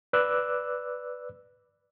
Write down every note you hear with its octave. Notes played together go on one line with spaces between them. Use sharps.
B4 D5 D6 E6 F#6